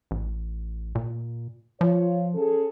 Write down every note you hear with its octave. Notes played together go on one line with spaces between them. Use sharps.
A1
A#2
F3 F4 C#5
C#4 G#4 A4